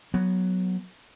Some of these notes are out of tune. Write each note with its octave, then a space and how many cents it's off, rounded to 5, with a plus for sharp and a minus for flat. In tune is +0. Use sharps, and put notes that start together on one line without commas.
F#3 +0 B3 +0